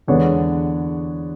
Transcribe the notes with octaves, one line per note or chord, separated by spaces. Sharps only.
E2 D3 G#3 B3 D4 C#5